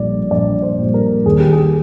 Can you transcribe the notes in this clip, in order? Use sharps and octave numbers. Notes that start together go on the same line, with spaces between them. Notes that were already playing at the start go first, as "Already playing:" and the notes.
Already playing: A#1 A#2 G3 D5
A#1 D5
C5
A#2 G3
A#4
D#2 G#4
G4
G#4